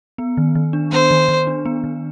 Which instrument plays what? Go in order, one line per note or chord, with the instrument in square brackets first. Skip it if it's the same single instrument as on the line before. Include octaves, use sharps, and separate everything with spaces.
[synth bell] B3
D#3
D#3
D4
[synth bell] B3 [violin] C5
[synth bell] D#3
D#3
D4
B3
D#3